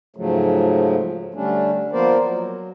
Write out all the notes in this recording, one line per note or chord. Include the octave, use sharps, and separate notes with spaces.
G#2 C#3 F3 F#3 A3
D3 G3 A3 C#4 D4
F3 A#3 B3 A#4 C5 D5
F#3